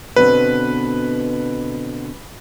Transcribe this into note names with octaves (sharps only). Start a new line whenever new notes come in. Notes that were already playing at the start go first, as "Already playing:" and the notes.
B2 D3 C4 B4